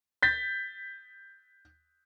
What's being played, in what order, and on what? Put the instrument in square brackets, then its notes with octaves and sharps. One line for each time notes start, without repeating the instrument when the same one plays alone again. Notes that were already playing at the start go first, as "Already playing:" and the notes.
[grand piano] G6 A6 B6